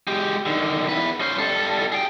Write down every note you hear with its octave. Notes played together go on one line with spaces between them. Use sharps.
G#3 G4
D3 D#3
E2 B4
C#4 C5
G3 A4
G#4 G5